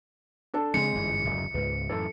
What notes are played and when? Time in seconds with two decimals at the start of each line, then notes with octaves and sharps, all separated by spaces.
0.54 D4 A4 A5
0.74 C#3 G#3 C4 D4 C#7
0.95 G1 F#2 E3
1.24 D1 F#2 C#3
1.54 C#2 G#2 B4
1.89 F#2 A2 E3 A4